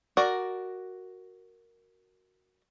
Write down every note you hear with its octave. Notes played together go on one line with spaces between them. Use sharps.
F#4 A#4 D5